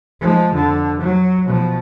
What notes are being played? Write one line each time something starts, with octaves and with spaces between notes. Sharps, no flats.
F3 G#3
F2 D3
F#3
B2 F3